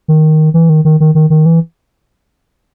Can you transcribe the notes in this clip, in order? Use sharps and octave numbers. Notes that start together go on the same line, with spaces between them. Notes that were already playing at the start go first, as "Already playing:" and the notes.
D#3
E3
D#3
D#3
D#3
D#3
D#3
E3